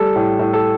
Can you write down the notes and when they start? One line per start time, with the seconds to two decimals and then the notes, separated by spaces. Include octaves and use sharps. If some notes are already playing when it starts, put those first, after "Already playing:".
Already playing: G3 A4
0.16 A2
0.39 A2
0.53 A4